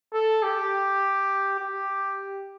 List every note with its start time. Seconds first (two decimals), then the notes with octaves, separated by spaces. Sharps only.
0.13 A4
0.43 G4
1.59 G4